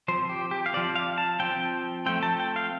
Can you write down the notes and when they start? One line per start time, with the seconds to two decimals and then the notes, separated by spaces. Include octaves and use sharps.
0.08 F3 C4 C5
0.29 G4
0.51 G4
0.66 F5
0.74 F3 C4 D5
0.96 F5
1.18 A5
1.40 F3 C4 G5
2.06 F3 A3 C4 G5
2.23 A5
2.40 G5
2.56 F5